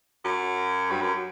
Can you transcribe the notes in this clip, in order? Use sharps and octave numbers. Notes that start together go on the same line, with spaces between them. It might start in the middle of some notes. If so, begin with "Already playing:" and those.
F#2
G2
F#2